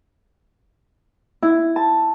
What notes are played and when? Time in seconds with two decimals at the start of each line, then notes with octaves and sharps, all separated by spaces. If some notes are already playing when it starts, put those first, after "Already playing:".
1.42 E4
1.76 A5